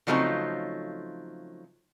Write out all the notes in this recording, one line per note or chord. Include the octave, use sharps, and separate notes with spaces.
C#3 F3 F#3 A3 C4 D#4